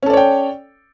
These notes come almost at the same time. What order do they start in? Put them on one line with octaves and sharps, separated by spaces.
C#4 A4 D5 C#5 G5